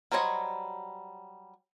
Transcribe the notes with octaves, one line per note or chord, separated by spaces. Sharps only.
F#3 G3 C5 C#5 D#5